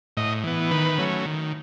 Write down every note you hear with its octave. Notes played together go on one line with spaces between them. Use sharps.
A2 D#5
E3 B3
D#3 B4
F#3 A3 C#4
D#3